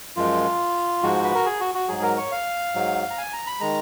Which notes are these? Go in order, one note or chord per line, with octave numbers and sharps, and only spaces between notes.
F#2 F3 G#3 F4
G#2 F3 G#3 F#4
B4
A#4
G#4
F#4
F#4
G#2 F#3 G#4
A#4
C#5
F5
G#2 F#3
A#5
G#5
A#5
B5
D#3 G#3 A#5